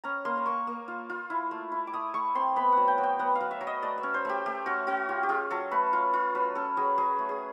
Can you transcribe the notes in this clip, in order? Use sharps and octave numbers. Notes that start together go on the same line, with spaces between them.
C#4 A#5
A#3 C6
C6
A#3 C#6
A#3
F4
F4
E4
A3
E4
D6
A3 D#6
A3 C#6
C4 C6
B3 B5
F#3 F#5
G5
F#3
G5
B3 F#5
F5
F#3
E5
F#3
D#5
A3 D5
E5
C#4
C5
A3 G4
A3 G4
C#4 F#4
C#4 F#4
F4 G4
G4
F4 G#4
F#3 A4
A3 B4
F4
F4
F#3 B4
C#4 A4
F#3 G#4
F#3 G#4
A3
G#4